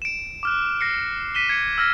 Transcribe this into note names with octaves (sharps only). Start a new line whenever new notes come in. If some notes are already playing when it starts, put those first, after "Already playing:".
D7 E7
D6 F6 F#6
F6 A#6 C7 C#7
B6 D#7 E7 G7
G#6 C#7
E6 F6 A#6